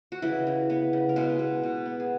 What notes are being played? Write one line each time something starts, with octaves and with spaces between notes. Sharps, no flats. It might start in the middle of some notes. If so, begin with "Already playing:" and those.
F#4
C#3 E3 E4
C#3
B3
C#3
A#4
B2 G#3 G#4
B2
B2
B3
G#4